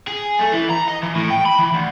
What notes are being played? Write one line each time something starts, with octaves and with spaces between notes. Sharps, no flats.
G#4
A3
E3
A#5
D#5
E3
A2
G5
B5
E3
D2